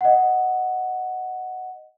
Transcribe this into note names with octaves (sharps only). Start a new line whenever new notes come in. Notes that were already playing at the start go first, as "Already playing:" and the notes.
D#5 F#5